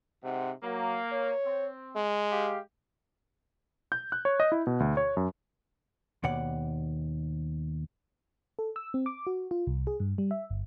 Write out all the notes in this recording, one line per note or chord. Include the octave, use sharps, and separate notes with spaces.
G#2 C3 F#5
F#3 A#3
C#5
C4
G#3
G4 F5
G6
F#6
C#5
D#5
E4
B2
D2
C#5
F#2
D#2 B2 D5 F#5
A4
E6
C4
D6
F#4
F4
C2
G#4
G2
G3
E5
G1